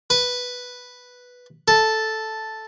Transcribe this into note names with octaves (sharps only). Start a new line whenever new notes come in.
B4
A4